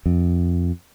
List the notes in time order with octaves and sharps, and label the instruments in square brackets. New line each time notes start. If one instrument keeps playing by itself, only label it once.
[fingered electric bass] F2